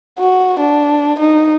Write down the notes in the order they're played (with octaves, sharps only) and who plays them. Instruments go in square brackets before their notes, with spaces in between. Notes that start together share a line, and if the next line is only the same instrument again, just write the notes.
[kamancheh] F#4
D4
D#4